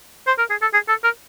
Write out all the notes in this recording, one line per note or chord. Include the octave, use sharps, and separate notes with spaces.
C5
A#4
G#4
A4
G#4
A4
A#4